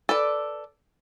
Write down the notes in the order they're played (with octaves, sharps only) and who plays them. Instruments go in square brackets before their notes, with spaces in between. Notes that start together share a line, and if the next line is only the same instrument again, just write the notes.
[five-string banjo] A4 B4 D5